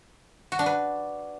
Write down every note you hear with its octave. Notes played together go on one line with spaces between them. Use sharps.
F#4
D4
B4